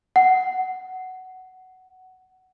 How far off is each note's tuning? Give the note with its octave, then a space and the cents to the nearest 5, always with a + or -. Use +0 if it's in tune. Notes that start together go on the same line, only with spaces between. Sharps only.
F#5 +10